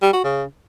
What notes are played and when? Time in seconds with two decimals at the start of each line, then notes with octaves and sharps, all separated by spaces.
0.02 G3
0.13 F#4
0.24 C#3